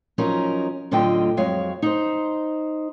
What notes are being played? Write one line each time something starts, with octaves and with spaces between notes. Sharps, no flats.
F3 F#3 C#4 D#4 A#4
A2 D3 F#3 F4 D#5 G5
F2 F#3 G#3 C#5 F5
D#4 C5